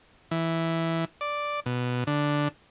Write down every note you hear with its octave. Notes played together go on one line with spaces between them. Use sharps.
E3
D5
B2
D3